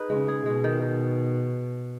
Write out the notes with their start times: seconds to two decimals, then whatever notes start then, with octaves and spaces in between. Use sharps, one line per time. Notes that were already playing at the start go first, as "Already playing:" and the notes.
Already playing: D#4 G#4 B4
0.10 C#3 G#3
0.28 G#4
0.46 B2 G#3
0.64 D#3
0.82 D#3